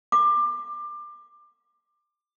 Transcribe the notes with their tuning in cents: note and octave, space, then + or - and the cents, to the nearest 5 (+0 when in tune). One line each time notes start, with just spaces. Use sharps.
D6 +25